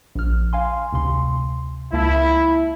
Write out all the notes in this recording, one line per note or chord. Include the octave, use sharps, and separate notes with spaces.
A#1 F6
F5 G#5 C6
D2 C3 C6
C#2 A#3 E4 A5